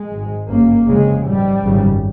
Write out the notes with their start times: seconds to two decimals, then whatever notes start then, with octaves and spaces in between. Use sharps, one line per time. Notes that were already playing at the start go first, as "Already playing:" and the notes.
Already playing: G#3
0.10 G#1 G#2
0.48 G1 F#2 C#3 A#3
0.87 F1 F2 C#3 G#3
1.25 A1 G#2 G3
1.64 G#1 F#2 C#3